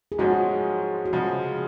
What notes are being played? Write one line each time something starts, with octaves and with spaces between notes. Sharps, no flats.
G#4
G#2 F3 G#3 C#4 F#4
F#4
C#3 F3 G#3 G#4